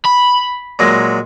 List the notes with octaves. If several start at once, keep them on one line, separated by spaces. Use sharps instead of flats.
B5
A#2 F#3 G#3